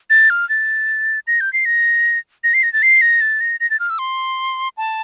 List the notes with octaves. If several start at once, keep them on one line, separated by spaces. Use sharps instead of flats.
A6
F6
A6
A#6
G6
C7
A#6
A#6
C7
A#6
A6
C7
A#6
A6
A#6
A#6
A6
F6
E6
C6
A5